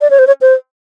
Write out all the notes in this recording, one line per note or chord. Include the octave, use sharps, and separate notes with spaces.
D5
C#5
C5
C#5
C5